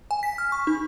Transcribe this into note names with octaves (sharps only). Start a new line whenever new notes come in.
G#5
B6
F6
C#6
D#4